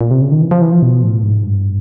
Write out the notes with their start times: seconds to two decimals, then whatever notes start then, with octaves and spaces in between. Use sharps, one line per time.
0.01 A#2
0.11 C3
0.22 C#3
0.32 D#3
0.41 E3
0.51 F3
0.62 E3
0.72 F3
0.82 B2
1.03 A2
1.23 G#2
1.45 G2